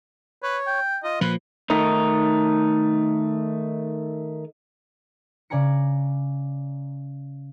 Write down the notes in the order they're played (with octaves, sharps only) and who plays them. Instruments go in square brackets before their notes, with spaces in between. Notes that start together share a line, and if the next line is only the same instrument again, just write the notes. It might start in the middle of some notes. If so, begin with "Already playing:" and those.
[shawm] B4 [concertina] C#5
[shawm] G5
[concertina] F4 [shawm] D#5
[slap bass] A#2 F3 [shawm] B4
[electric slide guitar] D#3 A3 D#4
[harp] C#3 D5 G#5 A#5 C#7